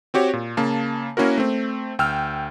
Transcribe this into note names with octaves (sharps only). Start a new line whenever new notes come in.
C4 F#4 G4 C#5
A#2
C#3 A#3 A5
A#3 C#4 E4 F#4 A#4
A3 C4
D2 G5 E6 F6